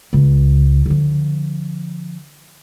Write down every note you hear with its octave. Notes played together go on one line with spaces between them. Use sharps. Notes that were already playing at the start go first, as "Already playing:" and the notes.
C#2
D3 F3